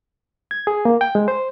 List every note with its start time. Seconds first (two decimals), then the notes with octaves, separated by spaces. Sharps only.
0.51 G#6
0.67 G#4
0.85 A#3
1.01 G5
1.15 G#3
1.28 C5